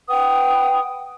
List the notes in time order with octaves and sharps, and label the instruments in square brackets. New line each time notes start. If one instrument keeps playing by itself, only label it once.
[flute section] B4 F#5 G5 D#6